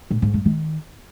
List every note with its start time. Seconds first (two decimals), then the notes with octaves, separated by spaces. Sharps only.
0.11 A2
0.22 G#2
0.34 G2
0.45 D#3